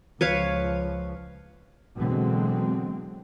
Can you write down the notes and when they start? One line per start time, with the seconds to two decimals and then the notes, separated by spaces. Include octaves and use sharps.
0.21 C#2 F3 B4 C#5 F5
1.96 B2 D3 E3 F#3 G#3 C4